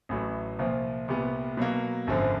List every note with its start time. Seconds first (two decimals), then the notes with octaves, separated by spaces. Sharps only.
0.09 A1 A2 F#3
0.59 C2 A#2 F3
1.08 C2 A#2 G3 B3
1.57 B2 F#3 A#3
2.07 G#1 F#2 D3 F3